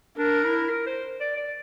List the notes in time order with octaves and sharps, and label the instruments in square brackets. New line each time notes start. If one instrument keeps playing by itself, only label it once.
[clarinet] D4 [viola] A#4
[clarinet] E4
A#4
C5
D5
D5